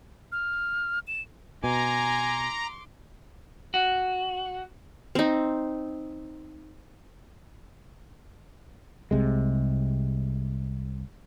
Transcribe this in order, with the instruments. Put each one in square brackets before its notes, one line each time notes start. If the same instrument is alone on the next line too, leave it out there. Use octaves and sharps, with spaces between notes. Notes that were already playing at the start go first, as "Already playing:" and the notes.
[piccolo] F6
E7
[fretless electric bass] B2 [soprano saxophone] G#5 [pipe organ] A#5 [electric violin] C6 D6
[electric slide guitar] F#4
[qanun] C4 D#4
[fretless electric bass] C2 C3 G#3